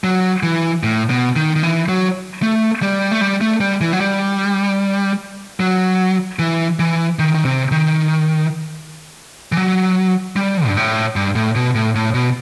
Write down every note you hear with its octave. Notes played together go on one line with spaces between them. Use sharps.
F#3
E3
A2
B2
D#3
D#3
E3
F#3
A3
G3
A3
G3
A3
G3
E3
F#3
G3
F#3
E3
E3
D#3
D#3
C3
D#3
E3
F#3
G3
G2
A2
G2
A2
B2
A2
A2
B2